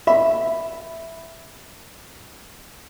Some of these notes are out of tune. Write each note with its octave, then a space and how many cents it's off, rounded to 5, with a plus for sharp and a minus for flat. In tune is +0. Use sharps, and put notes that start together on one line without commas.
E5 +0 B5 +0